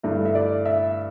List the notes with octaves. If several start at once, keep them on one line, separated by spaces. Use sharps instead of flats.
G2 D3 A3 E4 E5
E5
D5
E5